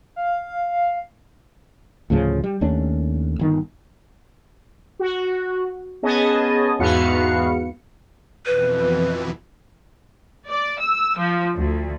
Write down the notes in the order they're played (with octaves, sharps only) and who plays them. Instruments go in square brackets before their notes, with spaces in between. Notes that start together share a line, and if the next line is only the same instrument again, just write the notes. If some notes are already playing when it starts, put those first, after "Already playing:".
[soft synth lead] F5
[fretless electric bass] D2 A2 C#3 F3
G3
D#2 A3 C#4 D4
G1 D#3
[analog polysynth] F#4
B3 C#4 G#4 D#5 G#5 A5
E2 G#2 B3 F#4 F5 C#7
[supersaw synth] F2 B2 E3 [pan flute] B4
[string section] D5
E6
F3
D2